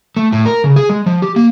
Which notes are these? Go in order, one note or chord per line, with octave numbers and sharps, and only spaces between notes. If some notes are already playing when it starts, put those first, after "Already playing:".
A3
A2
A#4
C#3
G#4
G#3
F3
G4
A#3